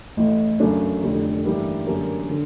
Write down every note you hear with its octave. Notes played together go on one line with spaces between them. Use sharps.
A1 A2 E3
F#2 C#3 F#3 A3 D4
F1 F2 D3 G3
G2 E3 G3 A#3 D#4
F#2 D3 G3 A#3
D3